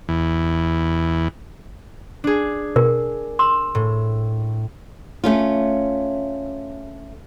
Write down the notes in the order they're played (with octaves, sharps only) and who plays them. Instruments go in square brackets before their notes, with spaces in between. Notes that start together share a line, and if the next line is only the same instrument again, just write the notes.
[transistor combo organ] E2
[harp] D4 G#4
[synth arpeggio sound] B2 [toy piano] A#4
[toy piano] C6 [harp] E6
[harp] A2
[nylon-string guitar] A3 C#4 F4